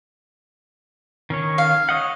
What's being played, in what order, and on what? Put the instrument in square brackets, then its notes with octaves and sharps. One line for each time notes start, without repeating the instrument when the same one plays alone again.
[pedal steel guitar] D#3 C#4 C#5
[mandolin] F5
[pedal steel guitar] C#5 D#5 F#5